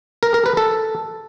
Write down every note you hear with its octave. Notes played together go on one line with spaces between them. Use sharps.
A#4
A#4
B4
A4